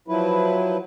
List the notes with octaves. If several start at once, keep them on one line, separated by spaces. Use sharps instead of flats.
F3 F#3 E4 B4